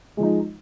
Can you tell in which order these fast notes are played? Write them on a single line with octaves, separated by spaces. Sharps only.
G#3 F3 D#4